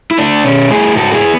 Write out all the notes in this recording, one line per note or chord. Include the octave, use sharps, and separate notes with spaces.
E4
A3 D4
B2 C#4
A3 E4 G#4
G#2 F#4 A4
E4 G#4
B3